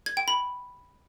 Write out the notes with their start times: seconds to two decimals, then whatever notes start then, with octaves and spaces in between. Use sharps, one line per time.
0.06 G#6
0.17 G5
0.28 B5